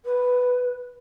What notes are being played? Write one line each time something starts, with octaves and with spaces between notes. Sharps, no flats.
B4